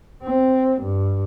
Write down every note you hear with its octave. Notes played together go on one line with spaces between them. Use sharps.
C4
G2